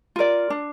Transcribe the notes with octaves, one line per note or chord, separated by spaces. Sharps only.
F4 A#4 D5
D4